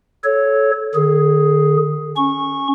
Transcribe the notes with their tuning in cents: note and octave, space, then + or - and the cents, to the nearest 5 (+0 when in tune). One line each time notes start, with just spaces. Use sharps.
A4 -20 C#5 +0
D3 +45 G#4 +5
C#4 +0 C#6 -15